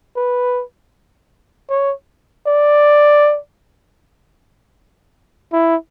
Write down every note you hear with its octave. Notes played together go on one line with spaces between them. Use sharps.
B4
C#5
D5
E4